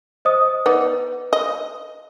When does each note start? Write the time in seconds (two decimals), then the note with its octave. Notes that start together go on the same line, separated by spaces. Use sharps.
0.25 C5 D#5 D#6
0.66 B3 D#4 B4 D5
1.33 D#5